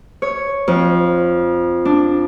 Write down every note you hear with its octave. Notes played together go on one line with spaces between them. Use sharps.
C#5
F2
D4